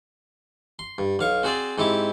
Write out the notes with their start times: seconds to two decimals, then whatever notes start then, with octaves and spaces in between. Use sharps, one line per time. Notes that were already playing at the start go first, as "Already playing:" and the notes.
0.79 C6
0.98 G2
1.19 B1 F5 C#6
1.43 C4 F#4 G#4 C5 D5
1.78 G#2 C4 E4 G4 D6